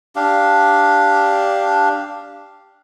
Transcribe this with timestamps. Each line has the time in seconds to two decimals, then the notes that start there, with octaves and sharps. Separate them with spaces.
0.16 D4 G4 F5